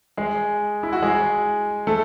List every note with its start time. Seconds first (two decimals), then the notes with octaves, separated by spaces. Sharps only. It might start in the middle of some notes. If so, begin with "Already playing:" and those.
0.17 G#3 G#4
0.83 E4
0.93 F#4
1.02 G#3 G#4
1.87 A3 A4